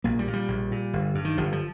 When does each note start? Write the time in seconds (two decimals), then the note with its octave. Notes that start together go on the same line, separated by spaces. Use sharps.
0.04 A#1 A#3
0.19 G3
0.27 A#2
0.33 G3
0.48 A#1
0.71 A#2
0.93 G1
1.15 G2
1.25 D#3
1.37 G1 F3
1.52 F3